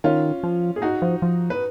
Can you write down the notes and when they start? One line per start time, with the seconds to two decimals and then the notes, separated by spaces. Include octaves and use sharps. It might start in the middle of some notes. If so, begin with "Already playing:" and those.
0.04 D#3 C#4 F4
0.43 F3
0.76 G#4
0.82 D#4 F#4
1.02 F3
1.22 F3
1.50 B4